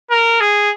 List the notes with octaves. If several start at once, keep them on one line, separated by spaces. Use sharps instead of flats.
A#4
G#4